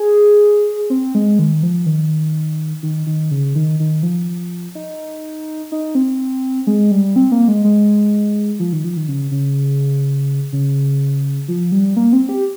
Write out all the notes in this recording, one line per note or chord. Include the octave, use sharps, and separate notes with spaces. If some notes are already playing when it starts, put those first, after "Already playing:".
Already playing: G#4
C4
G#3
D#3
F3
D#3
D#3
D#3
C#3
D#3
D#3
F3
D#4
D#4
C4
G#3
G3
C4
A#3
G#3
G#3
F3
D#3
F3
D#3
C#3
C#3
C#3
F3
G3
A#3
C4
G4